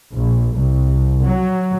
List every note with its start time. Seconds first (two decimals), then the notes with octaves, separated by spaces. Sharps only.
0.13 A#1
0.56 C2
1.25 F#3